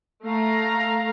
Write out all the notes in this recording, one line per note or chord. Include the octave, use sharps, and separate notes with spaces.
A3 F5 A#5